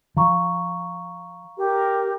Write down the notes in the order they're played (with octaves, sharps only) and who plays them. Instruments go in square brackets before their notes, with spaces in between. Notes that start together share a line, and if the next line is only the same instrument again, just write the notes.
[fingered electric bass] F3 [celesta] F5 A#5 C#6
[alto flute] G4 [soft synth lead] A#4